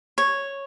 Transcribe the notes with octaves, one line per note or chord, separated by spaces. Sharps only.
C#5